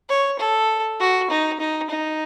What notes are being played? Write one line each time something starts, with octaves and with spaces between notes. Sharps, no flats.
C#5
A4
F#4
D#4
D#4
D#4